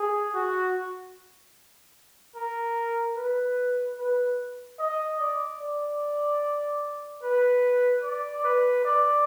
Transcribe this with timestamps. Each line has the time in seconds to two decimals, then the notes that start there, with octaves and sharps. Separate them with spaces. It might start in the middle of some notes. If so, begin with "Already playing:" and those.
Already playing: G#4
0.34 F#4
2.36 A#4
3.17 B4
3.98 B4
4.79 D#5
5.20 D5
5.61 D5
7.23 B4
8.03 D5
8.44 B4
8.85 D5